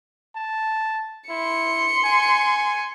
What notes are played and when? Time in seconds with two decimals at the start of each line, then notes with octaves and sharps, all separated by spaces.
0.35 A5
1.29 E4 C6 C#7
2.05 G#5